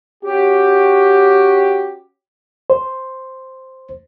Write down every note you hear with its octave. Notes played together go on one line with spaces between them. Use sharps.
C#4 F#4 G4
C5